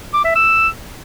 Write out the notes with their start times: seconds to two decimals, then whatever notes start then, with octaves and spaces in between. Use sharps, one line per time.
0.13 D6
0.24 E5
0.35 E6